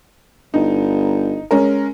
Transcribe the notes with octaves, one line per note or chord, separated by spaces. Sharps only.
G1 D#4
G#3 C#4 A#4